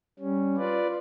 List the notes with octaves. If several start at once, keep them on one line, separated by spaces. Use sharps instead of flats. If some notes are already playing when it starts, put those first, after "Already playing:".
G3 C#4
F4 B4 D5